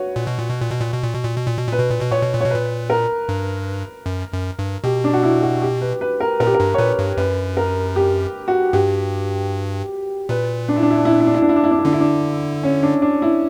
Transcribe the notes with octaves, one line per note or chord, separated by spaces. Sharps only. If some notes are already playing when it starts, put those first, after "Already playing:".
Already playing: F#4 B4 C#5
A#2
B2
A#2
B2
A#2
B2
A#2
B2
A#2
B2
A#2
B2
A#2
B2
A#2 B4
B2
A#2
B2
A#2 C#5
B2
A#2
B2 C#5
A#2 B4
A#4
G2
F#2
F#2
G2
B2 G4
D4
F#4
E4
F#4
G4
B4
B4
A#4
A#2 A#4
G4
A#4
G2
C#5
A#2 B4
G2
F#2 B4
A#4
G4
F#4
G2 G4
A#2 B4
D4
E4
D4
E4
D4
E4
D4
E4
D4
E4
D4
E4
D4
E4
D4
E4
D3 D4
E4
D4
C#4
D4
D4
E4